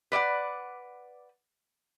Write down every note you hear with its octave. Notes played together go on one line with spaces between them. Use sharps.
B4 D5 E5 F#5